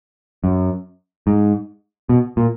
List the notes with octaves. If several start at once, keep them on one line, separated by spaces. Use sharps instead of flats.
F#2
G#2
B2
A#2